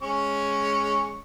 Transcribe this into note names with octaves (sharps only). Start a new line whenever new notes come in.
G#3 C#4 C#6